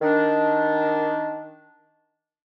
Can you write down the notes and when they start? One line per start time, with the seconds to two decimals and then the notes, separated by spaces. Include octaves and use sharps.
0.02 D#3 D4